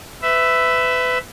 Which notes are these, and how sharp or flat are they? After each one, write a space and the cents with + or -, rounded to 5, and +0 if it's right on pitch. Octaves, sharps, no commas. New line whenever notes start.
B4 +30 E5 +0